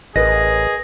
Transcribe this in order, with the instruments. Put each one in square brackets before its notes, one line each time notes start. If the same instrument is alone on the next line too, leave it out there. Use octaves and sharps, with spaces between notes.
[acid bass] A1 [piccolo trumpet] G#4 [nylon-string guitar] A#4 B4 D#5 [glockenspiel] A#6